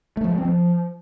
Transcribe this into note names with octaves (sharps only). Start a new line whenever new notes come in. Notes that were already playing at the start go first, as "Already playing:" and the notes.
A3
F3
G#3
C4
F3